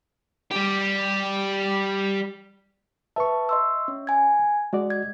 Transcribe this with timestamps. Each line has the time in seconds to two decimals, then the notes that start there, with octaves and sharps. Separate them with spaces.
0.51 G3 G4
3.16 B4 E5 A5 C#6
3.49 D#5 C6 E6
3.88 C#4
4.07 G#5 G#6
4.73 G#3 F#4 D5 D#5
4.90 G#6